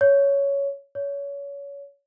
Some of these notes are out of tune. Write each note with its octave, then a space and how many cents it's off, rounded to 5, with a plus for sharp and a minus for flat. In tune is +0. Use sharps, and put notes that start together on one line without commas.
C#5 +10
C#5 +25